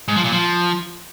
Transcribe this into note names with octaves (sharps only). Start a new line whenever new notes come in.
G#2
F3
A#2
F3